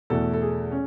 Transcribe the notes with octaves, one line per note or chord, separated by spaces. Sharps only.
E2 B2 A3 A4
A4
G#4
C#4